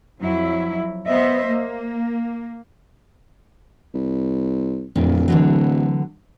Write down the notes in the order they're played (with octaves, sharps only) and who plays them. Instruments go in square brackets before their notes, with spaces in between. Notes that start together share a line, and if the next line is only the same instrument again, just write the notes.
[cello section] F2 F#3 E4
B3 C5 D#5 E5
A#3
[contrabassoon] C2
[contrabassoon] D1 [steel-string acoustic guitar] F2 A#2
[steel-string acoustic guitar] D3 E3 F#3